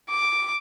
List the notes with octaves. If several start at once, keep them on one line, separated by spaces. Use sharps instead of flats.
D6